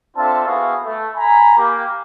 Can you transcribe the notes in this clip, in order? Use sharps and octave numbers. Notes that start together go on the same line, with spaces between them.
C4 D4 F4 A4 E5 A5
B3 E4 F#4 G#4 F5
A3
G#5 A#5 B5
A#3 G4